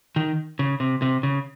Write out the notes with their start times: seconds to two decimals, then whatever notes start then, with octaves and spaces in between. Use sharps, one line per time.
0.16 D#3
0.59 C#3
0.80 C3
1.02 C3
1.23 C#3